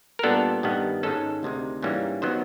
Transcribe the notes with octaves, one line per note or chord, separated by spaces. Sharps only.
A#4
A#2 G3 B3 D4 A4
G2 D#3 G3 B3
G#2 D#3 G#3 C#4 A4
D2 C3 D#3 G#3
G#2 E3 G3 A#3 C#4
D#3 F#3 B3 C5